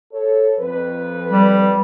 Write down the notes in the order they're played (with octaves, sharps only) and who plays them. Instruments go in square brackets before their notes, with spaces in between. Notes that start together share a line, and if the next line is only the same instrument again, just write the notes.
[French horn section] A4 C#5
F2 B4
[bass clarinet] G3